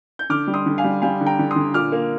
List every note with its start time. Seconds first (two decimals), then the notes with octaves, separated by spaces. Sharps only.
0.19 G6
0.30 D3 D6 F6
0.47 G3
0.54 C6 D#6
0.66 D3
0.78 F5 G#5
0.84 G3
1.02 G3 F5 G#5
1.21 D3
1.26 G5 A#5
1.39 D3
1.51 C6 D#6
1.56 D3
1.74 A#2 D6 F6
1.92 A#3